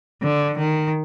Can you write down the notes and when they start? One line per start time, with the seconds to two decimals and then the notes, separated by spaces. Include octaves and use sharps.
0.23 D3
0.58 D#3